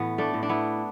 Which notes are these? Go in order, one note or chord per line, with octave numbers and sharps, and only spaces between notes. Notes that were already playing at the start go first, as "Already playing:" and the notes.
Already playing: A2 E3 B3
A3 D4
A2
D4
B3 E4